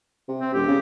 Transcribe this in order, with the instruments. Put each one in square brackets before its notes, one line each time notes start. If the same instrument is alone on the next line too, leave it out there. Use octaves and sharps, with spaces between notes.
[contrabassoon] C3
[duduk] C4
[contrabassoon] E1 [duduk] G4
[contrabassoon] C#3